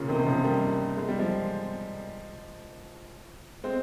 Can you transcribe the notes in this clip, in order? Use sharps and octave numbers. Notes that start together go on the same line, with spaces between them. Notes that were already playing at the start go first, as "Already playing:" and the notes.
Already playing: A#2 C#3
C3 D#3
D#3
C#3 F3
D#3 G3
G#3
G3
F3 G#3
G#3 C4